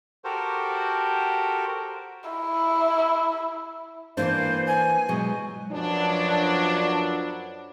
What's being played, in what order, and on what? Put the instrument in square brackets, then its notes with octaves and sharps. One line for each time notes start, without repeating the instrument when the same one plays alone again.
[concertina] F#4 G4 A4 A#4 C5
[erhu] E4
[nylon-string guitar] E3 A#3 D4 [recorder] C5
[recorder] G#5
[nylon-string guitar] B2 F#3 G#3
[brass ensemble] F#2 F3 F#3 B3 D4